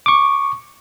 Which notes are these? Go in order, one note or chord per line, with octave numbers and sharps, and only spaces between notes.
C#6 D6